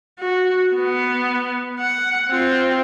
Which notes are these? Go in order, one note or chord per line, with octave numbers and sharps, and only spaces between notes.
F#4
B3
F#5
C4 F4